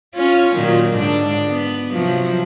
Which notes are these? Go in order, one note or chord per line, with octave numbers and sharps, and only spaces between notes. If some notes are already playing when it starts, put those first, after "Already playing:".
C#4 F4
A#2 D#3 F#3
G#2 D3 D4
B3
C3 F3 F#3